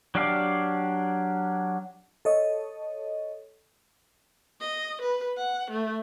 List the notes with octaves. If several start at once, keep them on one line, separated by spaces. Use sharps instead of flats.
F#3 D4 G4 D5 F5
A4 C#5 D#5
D#5
B4
F#5
A3